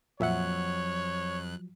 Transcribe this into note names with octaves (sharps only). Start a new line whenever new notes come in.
F2 A#2 F3 F#3 C#5 E5 F#5 F#6